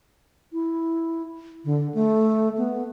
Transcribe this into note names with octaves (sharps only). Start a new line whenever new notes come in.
E4
D3
A3
B3